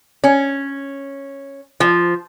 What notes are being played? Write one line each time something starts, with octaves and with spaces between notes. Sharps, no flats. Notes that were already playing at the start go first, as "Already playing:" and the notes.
C#4
F3